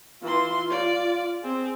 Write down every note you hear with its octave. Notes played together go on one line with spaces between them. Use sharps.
E3 F4 C6
D5
C4 G#4